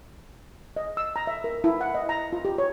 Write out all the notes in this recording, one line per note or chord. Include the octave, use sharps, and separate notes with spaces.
D#5
E6
A#5
E5
A#4
E4
F#5
D#5
A#5
F4
G4
C#5